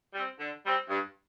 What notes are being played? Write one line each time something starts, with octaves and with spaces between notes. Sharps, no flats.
G3 C4
D3
G3 C4
G2